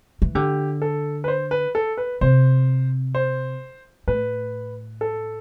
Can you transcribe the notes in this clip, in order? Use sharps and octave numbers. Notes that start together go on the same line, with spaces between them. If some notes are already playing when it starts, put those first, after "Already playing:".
E3
D3 G4
A4
B4
C5
B4
A4
B4
C3 C5
C5
A2 B4
A4